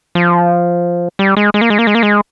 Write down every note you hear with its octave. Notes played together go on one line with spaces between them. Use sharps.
F3
G3
G#3
G#3
A#3
G#3
A#3
G#3
A#3
G#3